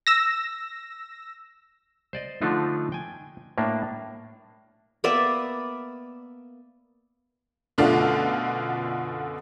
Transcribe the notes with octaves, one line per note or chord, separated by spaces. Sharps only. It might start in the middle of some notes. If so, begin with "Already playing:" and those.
E6 A#6
C5 D5 D#5
D3 F3 A3 D4 D#4 F4
G5 G#5
A2 A#3 D4
A#3 B3 D5 E5
F#2 B2 D3 A3 D4 F4